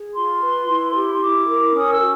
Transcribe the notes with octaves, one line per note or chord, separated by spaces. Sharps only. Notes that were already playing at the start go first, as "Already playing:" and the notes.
Already playing: G#4
F4 C6
B4
E4
G4
E4 D6
A#4
C#4 D#6
E6
F#4